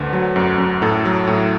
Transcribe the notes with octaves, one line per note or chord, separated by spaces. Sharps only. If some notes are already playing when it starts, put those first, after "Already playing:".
Already playing: D2 D3 B4
F#3
F#2
F#2
A2 A4
F#3
A2